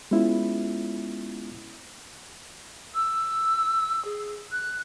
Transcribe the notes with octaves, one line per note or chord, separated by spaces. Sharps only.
G#3 B3 C#4 E4 F4
E6
G#4
F#6